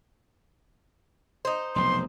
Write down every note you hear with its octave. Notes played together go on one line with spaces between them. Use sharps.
D#4 C5
F1 B1 C6